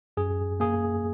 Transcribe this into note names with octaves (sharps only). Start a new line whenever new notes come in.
F#2 G#4
A#3 G#4